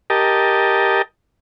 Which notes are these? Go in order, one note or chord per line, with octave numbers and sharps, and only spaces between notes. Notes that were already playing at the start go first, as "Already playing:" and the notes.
G4 A#4 D#5 A5